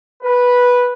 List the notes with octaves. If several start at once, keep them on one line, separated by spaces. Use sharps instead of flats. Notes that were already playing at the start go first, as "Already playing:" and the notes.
B4